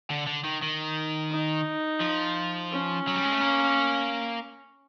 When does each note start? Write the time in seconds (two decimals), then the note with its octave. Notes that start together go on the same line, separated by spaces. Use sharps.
0.10 D3
0.27 D3
0.45 D#3
0.62 D#3
1.31 D#4
2.01 F3
2.71 C#4
3.08 F#3
3.16 G3
3.24 G#3
3.32 A3
3.41 A#3